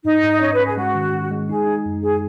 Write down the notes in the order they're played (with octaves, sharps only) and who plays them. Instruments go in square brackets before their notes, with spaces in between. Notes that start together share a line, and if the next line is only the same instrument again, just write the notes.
[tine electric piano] G#2 [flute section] D#4
[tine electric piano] G#2
[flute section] D#5
[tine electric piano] C#4 [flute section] C#5
[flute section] B4
[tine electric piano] C#4
[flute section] G#4
[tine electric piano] G#3 [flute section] F#4
[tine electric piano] D#3
D#3
G#3
[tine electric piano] D#4 [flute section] G#4
[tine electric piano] D#4
F#2
[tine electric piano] D#4 [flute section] G#4